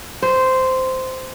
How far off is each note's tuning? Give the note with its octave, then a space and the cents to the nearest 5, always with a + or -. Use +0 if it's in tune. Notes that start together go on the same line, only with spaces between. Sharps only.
C5 -10